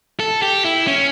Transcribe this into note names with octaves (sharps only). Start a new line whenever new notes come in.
A4
G4
E4
C#4